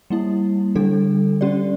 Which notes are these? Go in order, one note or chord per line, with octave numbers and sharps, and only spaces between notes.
G3 A#3 E4
D3 G3 D4 A4
G3 C#4 G4 D5